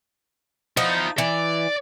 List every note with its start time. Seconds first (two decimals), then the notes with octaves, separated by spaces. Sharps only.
0.77 F3 D#4 E4 F#5
1.18 E3 D5